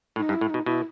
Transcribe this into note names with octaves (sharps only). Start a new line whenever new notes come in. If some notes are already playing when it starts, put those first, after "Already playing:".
A2 D#4
G2
E4
A2
B2 D#4
B2 E4